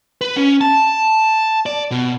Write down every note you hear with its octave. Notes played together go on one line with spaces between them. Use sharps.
B4
C#4
A5
D5
B2